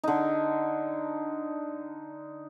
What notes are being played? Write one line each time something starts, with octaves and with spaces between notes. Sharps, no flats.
D3 D#4